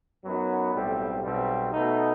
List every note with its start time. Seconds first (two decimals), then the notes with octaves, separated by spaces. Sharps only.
0.23 F#2 F#3 B3 D#4
0.73 B1 A2 G3 C4
1.23 B1 B2 G3 C4
1.72 B2 A3 D#4